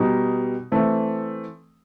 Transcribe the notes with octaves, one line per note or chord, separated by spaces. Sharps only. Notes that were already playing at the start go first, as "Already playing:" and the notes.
Already playing: B2 G3 D#4
E3 A3 C4